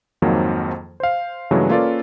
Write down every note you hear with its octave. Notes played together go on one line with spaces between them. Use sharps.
F2 G#2 D#3 F3 F#3 A#3
C5 F5
G2 C#3 E3 F#3 G#3 A3
A#3 C#4 F4 A4 B4 D5